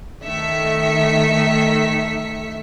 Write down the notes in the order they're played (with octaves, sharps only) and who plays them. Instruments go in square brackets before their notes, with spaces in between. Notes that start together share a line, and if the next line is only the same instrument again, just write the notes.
[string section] D#3 A3 E5 B6 C#7